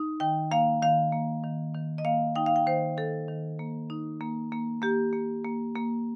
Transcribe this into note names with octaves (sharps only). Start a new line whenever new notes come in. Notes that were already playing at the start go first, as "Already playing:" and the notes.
Already playing: D#4
D#3 G5
A#3 F5
D#3 F5
A#3
D#3
D#3
D#5
A#3 F5
D#4 G5
F5
G5
D#3 C5
D#3 A4
D#3
A#3
D#4
A#3
A#3
A#3 G4
A#3
A#3
A#3